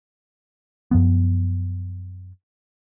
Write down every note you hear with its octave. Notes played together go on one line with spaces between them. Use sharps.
F#2 F3 B3